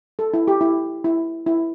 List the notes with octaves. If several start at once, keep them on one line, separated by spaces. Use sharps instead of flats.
A4
E4
G4
E4
E4
E4